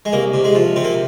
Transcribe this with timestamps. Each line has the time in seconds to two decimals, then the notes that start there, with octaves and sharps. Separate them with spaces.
0.05 G#3
0.13 C2 A#3
0.34 C3
0.45 G#3
0.55 F3
0.76 C3 C4
0.84 A#3